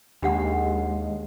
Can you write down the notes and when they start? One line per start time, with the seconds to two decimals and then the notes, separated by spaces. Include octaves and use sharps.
0.22 D#2 G#3 D4 G4 F#5